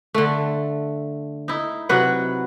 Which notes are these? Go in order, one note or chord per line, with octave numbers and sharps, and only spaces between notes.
D3 A3
D#4 E4
C3 F#3 B4 F#5